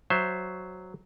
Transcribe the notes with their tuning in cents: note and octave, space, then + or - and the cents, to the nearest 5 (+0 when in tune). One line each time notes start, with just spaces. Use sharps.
F#3 +0 C5 +0 E5 +20